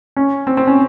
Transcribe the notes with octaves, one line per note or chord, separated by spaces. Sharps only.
C#4
C4
C4
C#4